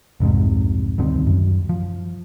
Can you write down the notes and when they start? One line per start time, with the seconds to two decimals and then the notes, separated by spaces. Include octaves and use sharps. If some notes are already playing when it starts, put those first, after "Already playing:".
0.20 C2 F2 G#2 C3
0.98 D2 G2 D#3 C4
1.27 F#2
1.69 F3